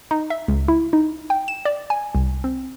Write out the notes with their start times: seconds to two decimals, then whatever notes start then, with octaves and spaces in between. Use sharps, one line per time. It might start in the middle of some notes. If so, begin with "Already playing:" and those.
0.11 D#4
0.30 E5
0.48 C#2
0.68 E4
0.93 D#4
1.30 G5
1.48 E7
1.65 D5
1.90 G#5
2.15 C2
2.44 C4